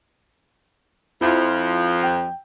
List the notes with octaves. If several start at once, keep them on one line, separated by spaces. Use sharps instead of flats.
F2 F3 E4
G5